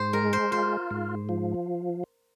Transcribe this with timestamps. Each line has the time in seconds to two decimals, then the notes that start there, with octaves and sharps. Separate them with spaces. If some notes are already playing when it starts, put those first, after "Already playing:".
Already playing: G#2 C5
0.13 G#3 A#4
0.33 C5
0.51 F4 C5
0.91 G#2
1.29 F3